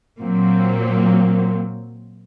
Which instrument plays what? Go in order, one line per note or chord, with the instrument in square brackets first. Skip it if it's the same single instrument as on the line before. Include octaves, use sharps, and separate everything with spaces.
[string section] A#2 F#3 A#3 C4